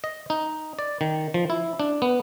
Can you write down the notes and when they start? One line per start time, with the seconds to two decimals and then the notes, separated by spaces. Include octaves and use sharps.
0.04 D#5
0.30 D#4
0.79 D5
1.01 D#3
1.34 F3
1.50 E4
1.80 D4
2.02 B3